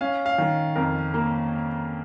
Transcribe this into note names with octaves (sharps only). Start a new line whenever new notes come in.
C#4 F5
F5
D#3
F2 A#4
A#3